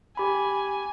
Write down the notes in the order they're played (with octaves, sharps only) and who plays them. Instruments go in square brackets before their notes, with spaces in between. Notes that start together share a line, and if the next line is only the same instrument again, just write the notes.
[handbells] G4 B5 [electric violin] G#5